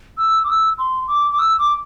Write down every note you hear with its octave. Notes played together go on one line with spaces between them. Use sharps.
E6
D6
E6
C6
D6
D6
E6
D6